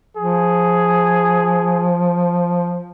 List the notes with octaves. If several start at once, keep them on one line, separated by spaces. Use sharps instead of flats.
F3 G#4